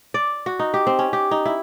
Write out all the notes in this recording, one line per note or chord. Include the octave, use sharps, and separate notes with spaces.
D5
F#4
D#4
G4
C4
C#4
G4
D#4
E4